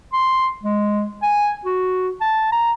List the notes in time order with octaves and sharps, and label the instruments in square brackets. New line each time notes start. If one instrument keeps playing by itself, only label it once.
[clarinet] C6
G#3
G#5
F#4
A5
A#5